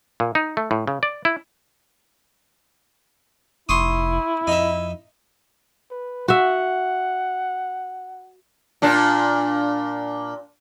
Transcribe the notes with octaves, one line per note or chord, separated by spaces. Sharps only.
A#2
D#4
A3
A2
C#3
D5
E4
F1 E4 C6 C#6 D#6
F2 D#4 E5
B4
F#4 E5 F#5
A#2 D4